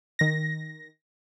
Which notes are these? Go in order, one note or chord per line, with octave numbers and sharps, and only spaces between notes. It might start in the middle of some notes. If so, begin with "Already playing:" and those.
D#3 A#6